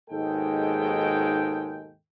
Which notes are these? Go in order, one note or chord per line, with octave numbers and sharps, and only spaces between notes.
D#2 G#2 B2 G#3 A4 G5